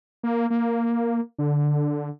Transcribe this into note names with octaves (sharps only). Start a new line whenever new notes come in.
A#3
A#3
D3